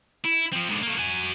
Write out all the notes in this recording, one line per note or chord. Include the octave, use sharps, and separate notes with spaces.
E4
F3 C4
G#2 D3
A3 A#3
F#4 G#5